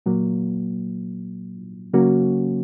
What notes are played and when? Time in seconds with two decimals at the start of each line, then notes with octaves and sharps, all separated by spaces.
0.06 A#2 F#3 A#3
1.93 C#3 F#3 A#3 C#4 F#4